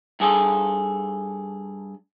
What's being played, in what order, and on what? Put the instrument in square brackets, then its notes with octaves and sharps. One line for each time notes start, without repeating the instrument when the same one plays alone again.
[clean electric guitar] G2 G#4 A4